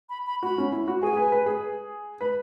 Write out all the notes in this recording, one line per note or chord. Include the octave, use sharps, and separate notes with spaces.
B5
B5
F#4 B5
C#4
E4
F#4
G#4 G#5
G#4
B4
B4
G#4
B4 B5